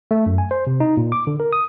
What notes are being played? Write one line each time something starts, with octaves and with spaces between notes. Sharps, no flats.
A3
F#2
G#5
C5
C3
D#4
A#2
D6
D3
A#4
D#6